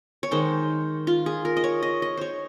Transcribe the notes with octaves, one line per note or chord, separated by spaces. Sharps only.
C#5
D#3 G#3 C5
F4
G#4
A#4
D#5
C#5
D#5
D#5
C5 C#5